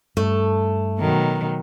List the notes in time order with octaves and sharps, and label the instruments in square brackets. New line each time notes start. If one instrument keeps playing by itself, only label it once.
[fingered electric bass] G2 [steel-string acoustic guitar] A3
[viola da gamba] B2 D#3 F#3